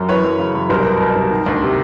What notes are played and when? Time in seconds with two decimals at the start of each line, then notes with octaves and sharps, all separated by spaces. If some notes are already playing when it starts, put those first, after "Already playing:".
Already playing: F#2
0.08 E3 B4 C#5
0.25 F#2
0.39 C#3
0.55 F#2
0.69 C2 A#4 C5
0.85 B2
1.00 B2
1.16 C2
1.31 D#3
1.46 D2
1.62 C3